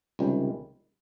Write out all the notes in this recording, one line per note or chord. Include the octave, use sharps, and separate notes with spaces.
C#2 C3 D#3 G3